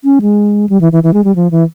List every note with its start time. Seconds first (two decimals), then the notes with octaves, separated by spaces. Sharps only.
0.04 C#4
0.22 G#3
0.69 G3
0.81 E3
0.92 E3
1.03 E3
1.13 G#3
1.24 G3
1.36 F3
1.51 E3